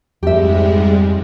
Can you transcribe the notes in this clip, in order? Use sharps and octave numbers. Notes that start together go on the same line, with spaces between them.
F2 G#2 G3 G#3 G4 E5